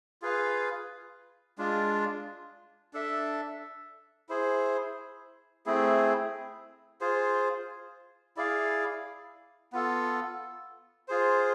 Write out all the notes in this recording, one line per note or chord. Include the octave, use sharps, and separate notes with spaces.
F4 G#4 B4 F5
G#3 D4 F4
D4 A4 E5
E4 G#4 C5
A3 C4 E4 G#4
F4 G#4 C5
E4 G#4 D5 F5
B3 F4 A4
F4 G#4 C5